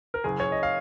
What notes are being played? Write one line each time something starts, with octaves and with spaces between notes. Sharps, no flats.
A#4
F#1 G#4
F#1 C#5
D#5
F5